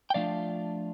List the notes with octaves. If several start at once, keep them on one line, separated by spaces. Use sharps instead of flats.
G5
F3 A3 D4 F4 D5 F5